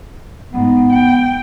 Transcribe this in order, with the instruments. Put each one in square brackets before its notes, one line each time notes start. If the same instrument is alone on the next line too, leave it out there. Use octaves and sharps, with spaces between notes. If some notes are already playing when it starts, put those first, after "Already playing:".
[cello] G#2 [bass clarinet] B3
[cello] G5